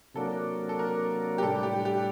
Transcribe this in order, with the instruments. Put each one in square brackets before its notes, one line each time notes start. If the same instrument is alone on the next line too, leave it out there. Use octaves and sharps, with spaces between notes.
[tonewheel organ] C3 F#3 A#3 D4 [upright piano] A4
[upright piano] A4
A#4
G4
[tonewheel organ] A2 G3 D4 [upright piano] A4
[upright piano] G4
G4